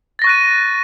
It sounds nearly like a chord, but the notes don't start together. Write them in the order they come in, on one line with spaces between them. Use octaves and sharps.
A6 A#6 C#6 F#6 D#7